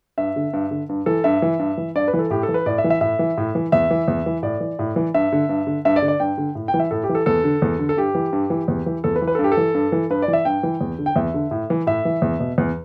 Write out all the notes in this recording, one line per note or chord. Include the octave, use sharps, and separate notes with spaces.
G2 E5
D3
G2
D3
G2
E3 A4
G2 E5
E3
G2
E3
G2 D5
B4
E3
A4
A2 G4
A4
E3
B4
A2 D5
E5
E3
E5
A2 E5
E3
A2
E3
E2 E5
E3
E2
E3
A2 D5
E3
A2
E3
G2 E5
D3
G2
D3
G2 E5
D5
D3
D5
G2 G5
D3
A2
G5
E3
E5
A2 A4
G4
E3
A4
E2 A4
D3
E2
D3
A4
G2 G4
E3
G2
E3
E2
E3
E2 A4
B4
E3
B4
A4
G2
G4
A4
E3
G2
E3
G2 B4
D5
E3
E5
G2 G5
E3
E2
D3
G5
E2 E5
D3
A2
E3
A2 E5
E3
E2
B2
E2